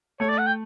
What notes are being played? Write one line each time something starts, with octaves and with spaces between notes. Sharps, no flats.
A3 C#5
D5
F#5
G5